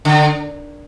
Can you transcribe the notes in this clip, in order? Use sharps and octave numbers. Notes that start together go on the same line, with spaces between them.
D3